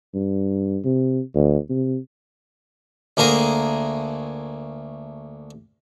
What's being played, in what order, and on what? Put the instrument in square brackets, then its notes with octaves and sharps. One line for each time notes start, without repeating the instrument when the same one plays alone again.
[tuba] G2
C3
D2
C3
[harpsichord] D2 A3 A#3 G#4 A#4 G#5